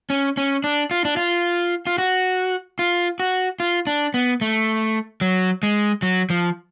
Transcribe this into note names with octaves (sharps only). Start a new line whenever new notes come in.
C#4
C#4
D4
F4
D4
F4
F4
F#4
F4
F#4
F4
D4
B3
A3
F#3
G#3
F#3
F3